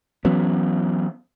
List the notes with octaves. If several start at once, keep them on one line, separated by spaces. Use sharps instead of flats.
E3 F#3 B3 C#4